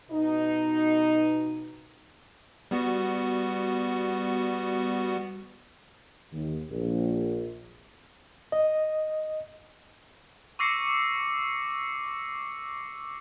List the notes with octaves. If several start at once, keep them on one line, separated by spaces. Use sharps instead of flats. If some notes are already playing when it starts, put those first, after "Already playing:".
B2 D#4
G3 B3 F#4
D#2
A#1
D#5
C#6 D6 E6 A#6 C7 C#7